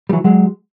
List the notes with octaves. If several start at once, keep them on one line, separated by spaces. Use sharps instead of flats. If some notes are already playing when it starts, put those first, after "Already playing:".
G3
E3 F#3
F#3 G#3